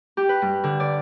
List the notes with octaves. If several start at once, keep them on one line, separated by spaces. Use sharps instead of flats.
G4
B4
G2
D3
D5